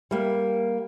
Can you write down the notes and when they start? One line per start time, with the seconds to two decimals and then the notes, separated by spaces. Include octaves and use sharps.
0.11 G3 A#3